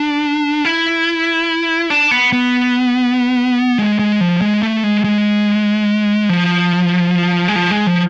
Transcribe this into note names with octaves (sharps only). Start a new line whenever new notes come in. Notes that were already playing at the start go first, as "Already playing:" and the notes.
Already playing: D4
E4
D4
B3
B3
G#3
G#3
F3
G#3
A3
G#3
G#3
F3
G#3
F3
G#3
F3